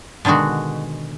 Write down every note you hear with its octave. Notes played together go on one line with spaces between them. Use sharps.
B2 D3 D#3 G#3 F#4